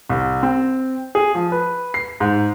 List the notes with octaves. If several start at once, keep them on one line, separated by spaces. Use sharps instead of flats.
C2
C4
G#4
F3
B4
C7
G#2